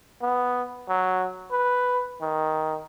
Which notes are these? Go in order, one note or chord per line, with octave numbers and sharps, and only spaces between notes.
B3
F#3
B4
D#3